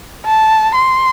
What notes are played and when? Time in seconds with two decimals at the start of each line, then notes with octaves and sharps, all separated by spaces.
0.25 A5
0.74 C6